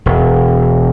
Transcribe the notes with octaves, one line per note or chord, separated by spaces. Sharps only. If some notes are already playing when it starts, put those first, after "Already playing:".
E1